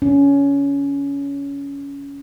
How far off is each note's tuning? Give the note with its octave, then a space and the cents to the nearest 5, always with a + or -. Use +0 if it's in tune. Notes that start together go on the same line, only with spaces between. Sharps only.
C#4 +20